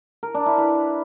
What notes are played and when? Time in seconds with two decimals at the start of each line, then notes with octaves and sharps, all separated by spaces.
0.23 A#4
0.35 D4
0.46 E4
0.58 B4